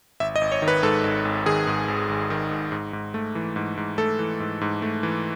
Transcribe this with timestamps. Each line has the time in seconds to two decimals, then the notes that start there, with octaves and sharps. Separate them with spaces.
0.20 G#1 E5
0.36 D#5
0.41 G#1
0.52 C#5
0.62 D#3
0.68 B4
0.83 G#2 A4
1.04 G#1
1.25 G#1
1.46 D#3 G#4
1.67 G#2
1.88 G#1
2.09 G#1
2.30 D#3
2.51 G#2
2.72 G#2
2.93 G#2
3.14 A3
3.35 E3
3.56 G#2
3.77 G#2
3.98 A3 A4
4.19 E3
4.40 G#2
4.61 G#2
4.82 A3
5.03 E3